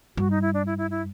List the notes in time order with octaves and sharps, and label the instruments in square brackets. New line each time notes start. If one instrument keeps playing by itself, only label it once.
[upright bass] G2 [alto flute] F#4
[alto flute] D#4
E4
D4
E4
E4
E4